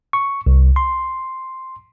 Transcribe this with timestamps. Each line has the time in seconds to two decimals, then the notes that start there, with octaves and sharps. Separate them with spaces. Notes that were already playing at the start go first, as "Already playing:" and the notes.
0.13 C#6
0.46 C2
0.76 C6